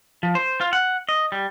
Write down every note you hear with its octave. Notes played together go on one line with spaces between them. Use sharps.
F3
C5
F4
F#5
D#5
G3